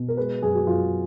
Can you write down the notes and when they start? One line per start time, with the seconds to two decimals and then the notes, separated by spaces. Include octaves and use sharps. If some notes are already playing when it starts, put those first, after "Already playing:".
Already playing: B2
0.08 A#4
0.17 G#3 B4
0.42 F#2 G#4
0.55 F#4
0.67 F#2 F4